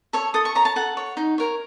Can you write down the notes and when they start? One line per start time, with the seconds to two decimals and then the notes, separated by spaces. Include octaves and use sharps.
0.13 A4 C#5
0.34 A4 D#6
0.45 C#6
0.55 C#5 A#5
0.65 A5
0.76 A4 F#5
0.97 C#5
1.17 D#4
1.38 A#4 C#5